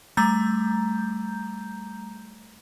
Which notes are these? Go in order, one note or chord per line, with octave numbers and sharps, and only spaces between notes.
G3 A3 A#5 G6